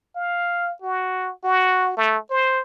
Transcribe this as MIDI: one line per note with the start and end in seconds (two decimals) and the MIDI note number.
0.16 0.74 77
0.82 1.32 66
1.44 1.96 66
1.97 2.18 57
2.31 2.62 72